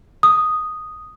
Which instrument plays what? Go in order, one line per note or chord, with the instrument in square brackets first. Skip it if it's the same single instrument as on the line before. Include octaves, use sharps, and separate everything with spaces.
[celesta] D#6